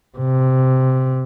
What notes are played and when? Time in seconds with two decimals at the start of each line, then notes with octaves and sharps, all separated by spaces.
0.18 C3